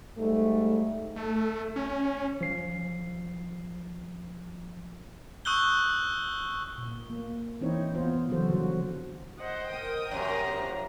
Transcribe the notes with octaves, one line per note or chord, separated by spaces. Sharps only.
G#2 G3 A3
A3
C#4
F3 C7
C#6 D#6 E6 F#6 G6 G7
A#2
A#3
E3 C4 D#4 E4 C#5
B3 F4 C5
C#3 E3 F#3 F#4 A4 C5
D3 F3 G3 F4 F#4
C5 D#5 F#5
A#4 G5 D#6
F#2 C3 A#5
F3 D4